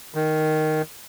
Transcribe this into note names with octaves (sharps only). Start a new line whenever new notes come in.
D#3